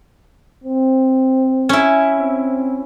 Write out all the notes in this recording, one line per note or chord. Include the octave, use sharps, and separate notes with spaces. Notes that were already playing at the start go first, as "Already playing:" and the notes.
C4
C#4 E4
C4